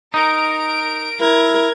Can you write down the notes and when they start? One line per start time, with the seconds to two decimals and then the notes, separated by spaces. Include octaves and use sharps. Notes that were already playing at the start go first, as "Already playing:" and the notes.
0.14 D#4 A#4 D7
1.21 E4 A#4 G#6